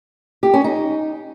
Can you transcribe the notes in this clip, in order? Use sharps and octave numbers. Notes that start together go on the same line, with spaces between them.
G4
C#4
D#4